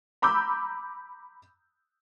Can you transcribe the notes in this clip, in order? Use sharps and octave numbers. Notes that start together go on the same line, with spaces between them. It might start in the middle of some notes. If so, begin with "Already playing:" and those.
A#5 B5 D6 E6 G6